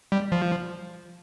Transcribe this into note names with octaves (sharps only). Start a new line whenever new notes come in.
G3
F3